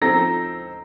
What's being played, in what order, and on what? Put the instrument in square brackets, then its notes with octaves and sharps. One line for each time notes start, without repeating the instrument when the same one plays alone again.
[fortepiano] F3 C4 D#4 A4 C5 [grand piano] A#5 A#6